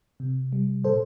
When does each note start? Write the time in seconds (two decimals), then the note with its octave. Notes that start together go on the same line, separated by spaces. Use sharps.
0.20 C3
0.53 G3
0.84 A#2 A4 C5